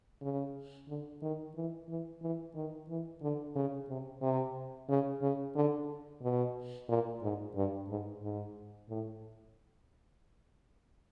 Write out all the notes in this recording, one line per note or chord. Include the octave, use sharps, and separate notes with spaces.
C#3
D3
D#3
E3
E3
E3
D#3
E3
D3
C#3
C3
C3
C#3
C#3
D3
B2
A#2
G#2
G2
G#2
G#2
A2